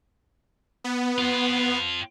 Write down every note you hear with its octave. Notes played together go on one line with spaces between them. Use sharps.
B3
C4 F4